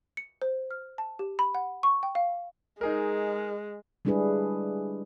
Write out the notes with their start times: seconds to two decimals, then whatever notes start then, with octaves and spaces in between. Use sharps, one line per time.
0.17 C#7
0.42 C5
0.71 F6
0.98 A5
1.19 G4
1.39 B5
1.55 F#5
1.83 C#6
2.03 G5
2.15 F5
2.81 G#3 D#4 G#4 A#4
4.05 G3 G#3 D4 E4 G#4 B4